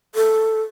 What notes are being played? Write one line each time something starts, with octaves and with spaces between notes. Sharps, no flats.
A4